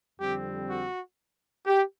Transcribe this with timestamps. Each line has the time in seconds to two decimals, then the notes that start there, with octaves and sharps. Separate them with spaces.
0.19 F2 D3 G3 C4 G4
0.69 F#4
1.67 G4